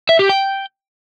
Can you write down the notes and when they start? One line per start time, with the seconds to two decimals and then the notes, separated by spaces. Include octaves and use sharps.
0.09 E5
0.19 G4
0.29 G5